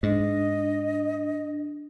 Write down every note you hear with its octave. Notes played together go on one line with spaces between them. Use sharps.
G#2 D4 D#5